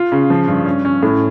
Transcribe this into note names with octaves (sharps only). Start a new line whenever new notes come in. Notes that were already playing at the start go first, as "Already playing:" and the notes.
Already playing: F4
C#3
F3
G2
C#4
C#4
A2